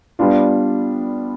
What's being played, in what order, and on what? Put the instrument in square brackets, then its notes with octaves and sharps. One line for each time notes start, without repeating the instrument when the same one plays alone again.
[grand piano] G3 B3 D4 F4